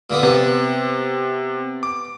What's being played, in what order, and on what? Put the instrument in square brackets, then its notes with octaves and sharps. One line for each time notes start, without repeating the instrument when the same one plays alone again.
[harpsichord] A#2 D3 B3
[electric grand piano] C3 [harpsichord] B3
[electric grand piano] D6